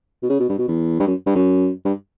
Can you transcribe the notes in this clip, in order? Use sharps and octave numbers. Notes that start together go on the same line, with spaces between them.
B2
C#3
B2
G2
B2
E2
G2
F#2
G2
F#2
G2